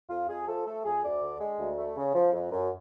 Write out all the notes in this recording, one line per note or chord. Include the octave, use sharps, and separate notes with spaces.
F2 F4
F2 G#4
F3 A4
A3 A4
F2 G#4
D2 D5
D3
G#3
D2
A3
C#3
F3
F2
F#2